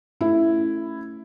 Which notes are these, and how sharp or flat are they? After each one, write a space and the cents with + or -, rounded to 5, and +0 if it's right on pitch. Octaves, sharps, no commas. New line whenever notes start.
A3 +0 C#4 +0 E4 +5